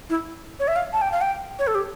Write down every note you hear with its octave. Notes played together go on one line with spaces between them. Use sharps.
E4
C#5
E5
F5
A5
G5
F5
G5
C#5
A4
G4